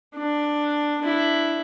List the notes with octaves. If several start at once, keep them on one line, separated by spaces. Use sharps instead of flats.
D4
D4 E4